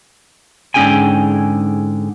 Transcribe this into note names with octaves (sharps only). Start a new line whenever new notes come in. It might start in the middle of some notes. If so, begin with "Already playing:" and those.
G#2 D3 C#4 G#4 G5 G#5